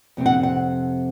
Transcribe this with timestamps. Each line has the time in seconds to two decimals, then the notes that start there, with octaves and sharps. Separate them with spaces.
0.17 F2 C3 C4
0.26 F#5
0.43 F#5